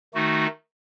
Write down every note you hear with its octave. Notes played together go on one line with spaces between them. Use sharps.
D#3 A3 D#4 F#4